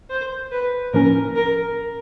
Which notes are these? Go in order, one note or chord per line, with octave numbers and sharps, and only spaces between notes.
C5
B4
A2 F3 A#3 C#4 A#4
A#4